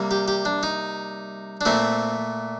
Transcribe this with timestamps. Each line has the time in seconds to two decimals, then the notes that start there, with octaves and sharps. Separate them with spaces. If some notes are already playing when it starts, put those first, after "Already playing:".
Already playing: C3 G3 A#3
0.11 G4
0.28 G4
0.45 D4
0.63 D#4
1.61 D4
1.65 A#2 A3 C4